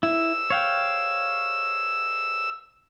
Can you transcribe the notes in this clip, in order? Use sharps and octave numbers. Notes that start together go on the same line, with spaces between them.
E4 E6
C#5 F5 G5